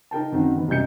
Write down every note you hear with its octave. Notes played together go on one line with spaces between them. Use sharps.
D#4 A#4 G5 A5
F#2 D#3 C4 D#4 F#5
D#3 B3
C2 F#2 D#5 G6 C#7